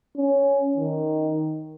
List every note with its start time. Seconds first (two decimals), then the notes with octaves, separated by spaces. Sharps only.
0.17 C#4
0.77 D#3